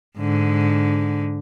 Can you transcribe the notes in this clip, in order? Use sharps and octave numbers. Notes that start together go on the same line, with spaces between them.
G#2 D3